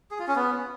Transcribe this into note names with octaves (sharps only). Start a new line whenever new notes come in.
G#4
F4
C#4
B3